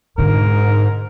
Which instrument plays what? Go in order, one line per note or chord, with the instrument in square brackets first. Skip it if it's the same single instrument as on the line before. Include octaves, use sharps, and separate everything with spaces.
[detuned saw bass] G#2 [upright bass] B2 D3 [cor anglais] A#4